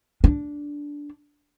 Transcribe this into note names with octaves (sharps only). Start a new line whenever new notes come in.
D4